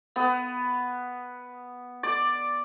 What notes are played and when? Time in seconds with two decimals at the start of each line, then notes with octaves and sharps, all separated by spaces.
0.16 B3
2.03 D5